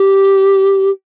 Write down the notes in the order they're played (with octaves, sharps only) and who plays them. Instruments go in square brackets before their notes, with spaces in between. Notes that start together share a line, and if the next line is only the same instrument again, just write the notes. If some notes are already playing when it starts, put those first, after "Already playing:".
Already playing: [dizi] G4